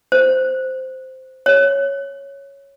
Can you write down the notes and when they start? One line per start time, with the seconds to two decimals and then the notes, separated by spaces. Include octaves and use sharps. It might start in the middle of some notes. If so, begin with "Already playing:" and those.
0.12 C5
1.46 C#5